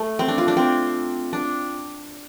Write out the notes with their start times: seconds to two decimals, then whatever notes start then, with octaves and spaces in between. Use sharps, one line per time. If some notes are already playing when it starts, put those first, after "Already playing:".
Already playing: A3
0.19 C4
0.28 D4
0.38 F4
0.48 D4
0.57 C4
1.33 D4